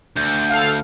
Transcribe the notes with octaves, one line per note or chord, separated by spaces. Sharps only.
D2 G6
A4 F5